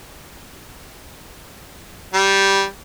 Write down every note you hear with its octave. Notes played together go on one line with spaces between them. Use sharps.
G3